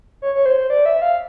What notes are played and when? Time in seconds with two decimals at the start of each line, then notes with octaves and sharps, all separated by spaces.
0.22 C#5
0.35 C#5
0.46 C5
0.70 D5
0.86 E5
1.02 F5